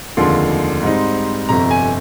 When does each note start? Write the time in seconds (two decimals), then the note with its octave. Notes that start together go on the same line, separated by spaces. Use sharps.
0.17 F1 D#2 D3 F3 G#3 C6
0.82 G#2 G3 C4 D#4
1.48 G1 F2 C3 A#5
1.71 G#5